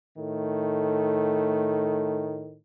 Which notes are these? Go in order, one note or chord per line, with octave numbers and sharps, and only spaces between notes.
A2 D#3 A3